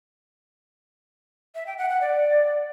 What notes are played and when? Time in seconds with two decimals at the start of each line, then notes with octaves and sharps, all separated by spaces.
1.55 E5
1.67 G5
1.78 F#5
1.90 F#5
2.01 D5